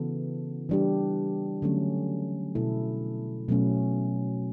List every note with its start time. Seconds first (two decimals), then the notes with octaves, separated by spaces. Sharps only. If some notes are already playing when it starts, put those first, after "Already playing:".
Already playing: C#3 E3 B3 F#4 A4
0.69 E3 G3 D4 G4
1.62 D3 F#3 A3 C#4
2.55 B2 A3 E4 A4
3.49 B2 F#3 A3 C#4